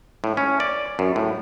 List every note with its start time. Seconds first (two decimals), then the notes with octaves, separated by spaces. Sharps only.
0.24 A2
0.37 C#4
0.60 D5
0.99 F#2
1.16 A2